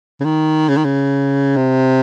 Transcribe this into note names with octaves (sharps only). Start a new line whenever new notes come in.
C#3
D#3
C#3
D#3
C#3
C3